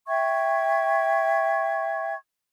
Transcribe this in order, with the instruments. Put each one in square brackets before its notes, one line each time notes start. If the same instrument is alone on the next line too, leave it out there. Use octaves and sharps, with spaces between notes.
[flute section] E5 G5 C#6 G#6